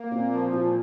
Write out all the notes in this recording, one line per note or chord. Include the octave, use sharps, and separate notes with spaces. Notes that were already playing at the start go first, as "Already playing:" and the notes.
Already playing: A#3
A#2 C4
F3
A#2 F4